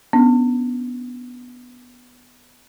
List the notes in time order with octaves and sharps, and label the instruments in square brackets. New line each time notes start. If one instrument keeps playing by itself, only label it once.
[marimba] B3 C#4 D4